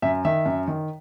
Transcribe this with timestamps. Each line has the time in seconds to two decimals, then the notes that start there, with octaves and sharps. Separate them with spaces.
0.02 F#2 E5
0.25 D#3 E5
0.46 F#2
0.68 D#3